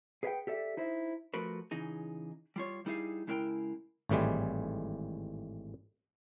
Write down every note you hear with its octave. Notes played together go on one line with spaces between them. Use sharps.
G#4 B4 C#5 E5 F#5 G5
G4 A4 D5 E5
D#4 E4 C5 E5
F3 A3 F#4 A#4 B4
C#3 E3 D#4 G#4
G3 F4 C#5
G3 D#4 E4 G#4 D#5 F5
C#3 G#3 E4 A#4 C#5 G5
G#1 A2 E3 G3 G#3